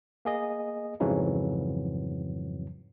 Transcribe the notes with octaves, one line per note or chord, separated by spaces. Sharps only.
A#3 G#4 D#5
F2 G#2 C#3 E3 F#3